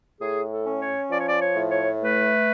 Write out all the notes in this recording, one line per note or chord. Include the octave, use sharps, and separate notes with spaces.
A2 G#4
A4
C#4
C#5
F3 D5
C#5
D5
C#5
A2
C#5
A3 B4